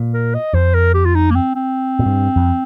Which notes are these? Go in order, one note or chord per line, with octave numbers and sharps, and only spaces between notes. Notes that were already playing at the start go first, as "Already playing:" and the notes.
Already playing: A#2
A#4
D#5
F2 C5
A#4
G4
F4
D#4
A#3
C4
C4
A#2
G2
F2